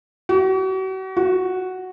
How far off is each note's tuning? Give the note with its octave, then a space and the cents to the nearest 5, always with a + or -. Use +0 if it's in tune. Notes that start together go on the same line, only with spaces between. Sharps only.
F#4 +40
F#4 +0